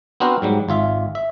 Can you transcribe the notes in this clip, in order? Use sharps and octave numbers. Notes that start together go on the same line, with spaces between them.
B3 C4 D4 F#4 A#4 C5
G#2 F#3 G3
G#1 F4 E5
E5